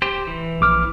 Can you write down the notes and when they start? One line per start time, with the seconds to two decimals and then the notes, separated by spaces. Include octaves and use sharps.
0.02 G4 C5
0.27 E3
0.61 A#1 D6 F6